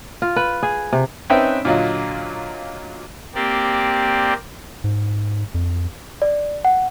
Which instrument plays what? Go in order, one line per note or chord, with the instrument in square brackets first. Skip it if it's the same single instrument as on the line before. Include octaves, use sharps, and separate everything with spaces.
[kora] F4
B4
G#4
C3
[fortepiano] C4 C#4 D#4 B4 E5 G5
A#2 D3 F#3 F4 D#5
[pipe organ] A#3 C4 G4 D5
[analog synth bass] G#2
F2
[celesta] D5
F#5